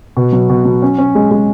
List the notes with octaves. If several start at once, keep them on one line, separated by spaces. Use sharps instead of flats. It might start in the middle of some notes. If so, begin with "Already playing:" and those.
B2
F#3
B2
F#3
C#4
C#4
G#3
G#3